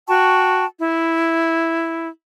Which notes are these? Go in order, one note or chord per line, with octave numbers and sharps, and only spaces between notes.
F#4 G5 A5 C#6
E4